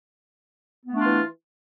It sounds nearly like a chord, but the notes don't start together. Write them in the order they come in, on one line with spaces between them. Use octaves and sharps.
B3 A3 D4 F4 E3